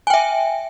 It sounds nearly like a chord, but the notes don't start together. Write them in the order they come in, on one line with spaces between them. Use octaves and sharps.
G#5 G5 E5